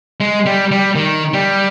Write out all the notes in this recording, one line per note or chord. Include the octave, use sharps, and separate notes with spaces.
G#3
G3
G3
D#3
G3